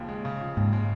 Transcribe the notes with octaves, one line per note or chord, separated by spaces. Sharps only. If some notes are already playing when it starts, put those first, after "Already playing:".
Already playing: D#2 C#3 F3
G#3
C#3
F3
D#2 G#2
G#3